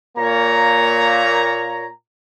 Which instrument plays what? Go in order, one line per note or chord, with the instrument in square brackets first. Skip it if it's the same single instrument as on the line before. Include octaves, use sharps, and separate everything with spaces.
[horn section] A#2 A#3 C#5 A#5